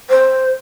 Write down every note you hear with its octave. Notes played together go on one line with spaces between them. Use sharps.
C5